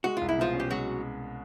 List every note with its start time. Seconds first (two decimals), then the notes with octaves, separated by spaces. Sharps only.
0.04 G#3 F#4
0.17 C2 F4
0.29 E4
0.38 B2 F3 F4
0.53 C#4
0.60 G4
0.70 F#3 G#3 F#4